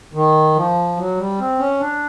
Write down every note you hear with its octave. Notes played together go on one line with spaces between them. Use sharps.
D#3
F3
F#3
G3
C4
C#4
D4